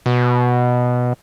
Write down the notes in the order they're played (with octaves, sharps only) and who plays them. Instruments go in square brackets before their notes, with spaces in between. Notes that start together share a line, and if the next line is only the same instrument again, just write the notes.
[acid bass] B2